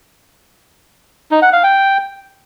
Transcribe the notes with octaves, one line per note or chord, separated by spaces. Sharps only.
D#4
F#5
F5
G5